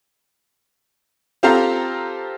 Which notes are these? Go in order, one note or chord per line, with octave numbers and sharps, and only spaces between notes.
C4 F4 G4 A4 F5 A#5